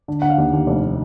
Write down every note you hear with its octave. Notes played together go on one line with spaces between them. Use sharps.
D3
D3 F#5
F5
D#2
D#2
F1